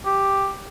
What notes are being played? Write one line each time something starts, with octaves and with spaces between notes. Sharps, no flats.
G4